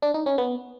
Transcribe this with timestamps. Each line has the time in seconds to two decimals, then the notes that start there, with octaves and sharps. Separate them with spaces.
0.02 D4
0.14 D#4
0.26 C#4
0.38 B3